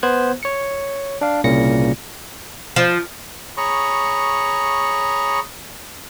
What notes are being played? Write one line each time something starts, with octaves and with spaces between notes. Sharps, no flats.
B3 C5 F#6 G#6
C#5 C#7
D4 F5
C2 A#2 C#3 A#6 C#7
F3
G#4 C#5 A#5 B5 C#6